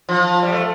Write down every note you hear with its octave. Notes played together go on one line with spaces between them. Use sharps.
F3
G3
A3